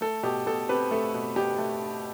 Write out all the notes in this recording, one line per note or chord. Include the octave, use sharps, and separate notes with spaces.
A3 A4
B2 G4
B2 A4
C4 G4 B4
A3 A4
B2
B2 G4
A3